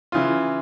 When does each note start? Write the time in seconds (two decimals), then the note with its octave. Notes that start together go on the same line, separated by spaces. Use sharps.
0.12 C#3 E3 F4